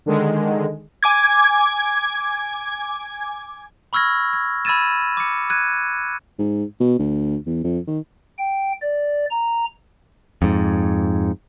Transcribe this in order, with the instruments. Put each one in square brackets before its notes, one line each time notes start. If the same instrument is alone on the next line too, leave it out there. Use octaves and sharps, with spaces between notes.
[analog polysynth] D3 D#3 G#3
[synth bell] G#5 D6 G#6
[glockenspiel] B5 C#6 E6 F6 G#6 A#6
G#6
B5 E6 G#6 A6 D#7 E7
D6 C#7
F#6 G#6 D#7
[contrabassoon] G#2
B2
D2
E2
F2
D#3
[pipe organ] G5
D5
A#5
[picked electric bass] F2 G#2